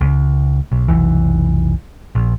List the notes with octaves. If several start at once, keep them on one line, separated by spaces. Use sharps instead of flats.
C#2
B1
F1 B1 E3
A#1